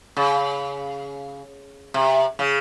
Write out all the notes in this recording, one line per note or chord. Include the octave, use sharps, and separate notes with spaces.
C#3
C3
C#3